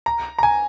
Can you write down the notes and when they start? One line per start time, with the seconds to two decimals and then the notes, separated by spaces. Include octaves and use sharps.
0.06 A#5
0.39 A#5
0.43 G#5